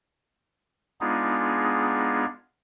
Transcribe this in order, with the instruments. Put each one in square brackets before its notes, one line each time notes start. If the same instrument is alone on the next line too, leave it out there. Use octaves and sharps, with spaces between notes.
[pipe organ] G#3 B3 D4 D#4 F4 G#4